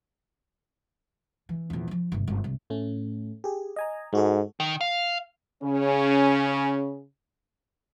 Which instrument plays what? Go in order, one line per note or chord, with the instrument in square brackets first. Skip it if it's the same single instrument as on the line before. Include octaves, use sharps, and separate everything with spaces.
[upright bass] E3
A#1 E2
E3 F3
G1 C2
G1
C2
[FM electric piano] A2 A3 C#4
G4 G#4
D#5 G#5 A#5
[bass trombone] G#2 [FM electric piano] G#3 F#4 A4
[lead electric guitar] D#3
F5
[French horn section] C#3 C#4